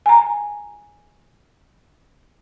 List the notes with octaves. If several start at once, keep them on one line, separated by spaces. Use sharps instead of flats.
G#5 A#5